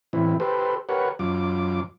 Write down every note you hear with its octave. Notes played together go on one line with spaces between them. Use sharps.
A2 E3 C4 E4
G4 A4 B4 C5
G4 A#4 B4 C#5 F#5
F#2 F4 D6